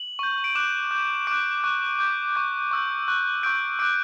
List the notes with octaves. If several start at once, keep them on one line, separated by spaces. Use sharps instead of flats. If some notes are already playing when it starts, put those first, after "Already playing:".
Already playing: F#7
C#6 G6
D7
D6 F#6 E7
D6 G6
D6 F#6 D7
C#6 F#6
D6 G6
C#6 G6
C#6 E6 G6
C#6 F#6
C#6 E6 G6 D7
D6 F#6 D7